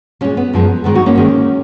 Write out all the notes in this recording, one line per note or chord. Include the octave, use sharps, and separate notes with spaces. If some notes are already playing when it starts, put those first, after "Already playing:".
A#2 G#3 A#3 C#4
B3
F#2 F3 G#3
G#2 D#3 G#3 B3
D#4 F#4
A#3 C#4
G#2 D#3 G#3